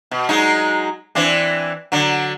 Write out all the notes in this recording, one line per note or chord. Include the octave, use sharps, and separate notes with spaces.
B2
F#3 G#3 D#4
E3 C4 D4
D3 F#3